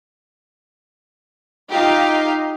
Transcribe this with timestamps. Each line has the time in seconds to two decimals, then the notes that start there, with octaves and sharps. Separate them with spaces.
1.71 D#4 F4 G4 F5